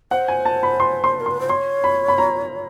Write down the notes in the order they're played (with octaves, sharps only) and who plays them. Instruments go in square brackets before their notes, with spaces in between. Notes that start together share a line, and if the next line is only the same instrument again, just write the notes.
[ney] C5 [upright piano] F#5
[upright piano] G#5
A5
B5
C6
C6
[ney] A#4
[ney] B4 [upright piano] C6
[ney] C5
[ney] C#5 [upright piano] C6
[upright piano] B5
B5
A#5